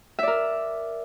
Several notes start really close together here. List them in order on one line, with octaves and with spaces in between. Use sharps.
E5 D5 A#4